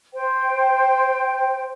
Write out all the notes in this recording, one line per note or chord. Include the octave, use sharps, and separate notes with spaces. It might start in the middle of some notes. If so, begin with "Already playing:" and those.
C5 G5